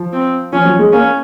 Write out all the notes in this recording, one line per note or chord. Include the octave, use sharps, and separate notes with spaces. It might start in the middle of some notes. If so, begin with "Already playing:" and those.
Already playing: F3
C4
F3 C#4
F#3
G#3
A#3 C#4